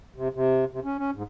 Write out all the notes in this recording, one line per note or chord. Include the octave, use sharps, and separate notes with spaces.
C3
C3
C3
C#4
C#4
G#2